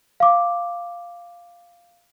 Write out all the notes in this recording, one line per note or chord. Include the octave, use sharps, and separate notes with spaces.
F5 D6